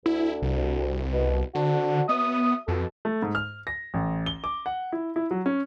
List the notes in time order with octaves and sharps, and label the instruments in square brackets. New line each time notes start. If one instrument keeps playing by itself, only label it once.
[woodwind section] D2 [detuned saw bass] E4
[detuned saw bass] C2
[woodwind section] B2
[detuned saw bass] D3 [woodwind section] C4 D4 F#4
[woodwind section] F#3 E5 D#6 [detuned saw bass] B3
[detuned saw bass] F2 [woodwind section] B2 A4
[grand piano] A3
G#2
F6
A#6
A1
G7
D6
F#5
E4
E4
F#3
C#4